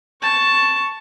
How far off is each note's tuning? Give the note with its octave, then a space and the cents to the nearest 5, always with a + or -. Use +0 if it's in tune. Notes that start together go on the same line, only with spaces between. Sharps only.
A5 +0 C#6 +0